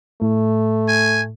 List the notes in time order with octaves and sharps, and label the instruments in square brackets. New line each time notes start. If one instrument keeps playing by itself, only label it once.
[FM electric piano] A2 [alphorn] A3
[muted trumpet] G#5